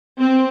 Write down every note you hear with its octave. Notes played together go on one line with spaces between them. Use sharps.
C4